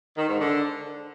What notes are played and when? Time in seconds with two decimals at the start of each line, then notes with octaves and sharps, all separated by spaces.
0.17 D#3
0.28 G#2
0.39 D3